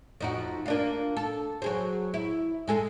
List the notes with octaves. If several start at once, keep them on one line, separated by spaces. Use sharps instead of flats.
F2 D#4 F#4
A#3 D4 F4
A4
F#3 G#4 C5
E4
G#3 G#4 A4